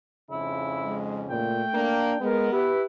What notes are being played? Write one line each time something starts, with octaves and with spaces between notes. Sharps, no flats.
F2 G#2 C#3 E4
G#3
A#2 A3 G5
A#3 D4
G#3 B3 A#4
E4 G4 B4